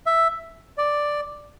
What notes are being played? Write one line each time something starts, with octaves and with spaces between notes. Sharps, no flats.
E5
D5